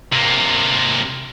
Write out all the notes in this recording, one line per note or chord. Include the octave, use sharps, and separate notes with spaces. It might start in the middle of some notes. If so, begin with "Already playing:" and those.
C3 A#3